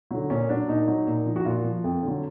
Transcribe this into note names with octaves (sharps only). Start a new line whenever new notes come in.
D3 F#3
A#2 C#4
F#3 D4
A#2 D#4
F#3
A#2
F3
F#4
A#2 F4
F3
F2
D3 F#3